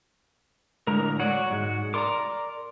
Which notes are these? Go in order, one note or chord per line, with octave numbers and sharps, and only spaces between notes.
A2 D3 G#3 A#4 A#5
F#4 C#5 D5 F#5
G#2 G#3
A#4 D5 A#5 C6 D6